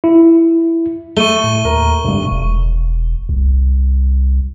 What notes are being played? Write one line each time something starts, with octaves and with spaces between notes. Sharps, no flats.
E4
A3 C#6 D#7 G7
A2
D#2 A#4
G#1 G2 C3
E1
C2